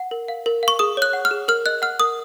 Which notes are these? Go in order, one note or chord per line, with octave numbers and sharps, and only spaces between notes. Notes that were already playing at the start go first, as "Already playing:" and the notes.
Already playing: F#5
A#4
F5
A#4
F5 C#6
G#4 D#6
C#5 F#6
F#5
F6
G#4
A#4 F6
D#5 F#6
F#5 F6
A#4 D#6